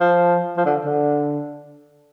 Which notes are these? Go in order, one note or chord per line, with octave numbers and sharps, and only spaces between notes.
F3
F3
D3
D3